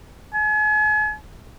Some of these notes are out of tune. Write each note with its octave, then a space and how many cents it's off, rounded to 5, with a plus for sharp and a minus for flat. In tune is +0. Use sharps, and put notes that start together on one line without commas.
G#5 +40